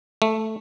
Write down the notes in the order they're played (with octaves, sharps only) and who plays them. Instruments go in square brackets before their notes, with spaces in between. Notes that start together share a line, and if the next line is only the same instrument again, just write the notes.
[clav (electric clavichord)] A3